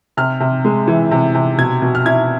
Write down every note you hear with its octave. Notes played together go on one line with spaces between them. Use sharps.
C3 F6
C3
G#3
E3
C3
C3
B2 G#6
B2
F6
E4 G#6